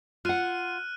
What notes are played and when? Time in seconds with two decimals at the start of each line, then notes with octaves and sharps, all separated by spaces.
0.25 F4 F#5 F6 F#6 D#7